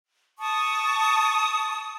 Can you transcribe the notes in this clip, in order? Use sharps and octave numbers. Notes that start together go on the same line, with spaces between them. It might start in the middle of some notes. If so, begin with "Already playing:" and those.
A5 C#6 D#6